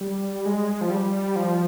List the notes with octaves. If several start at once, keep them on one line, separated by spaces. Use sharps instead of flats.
G3
G#3
F3
G3
F3